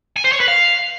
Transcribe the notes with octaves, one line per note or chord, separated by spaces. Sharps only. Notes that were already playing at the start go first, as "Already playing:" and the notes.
G#5
C5
C#5
B4
F5